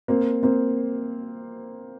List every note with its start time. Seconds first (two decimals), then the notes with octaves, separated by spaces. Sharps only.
0.08 A#3 C4
0.43 A#3 C4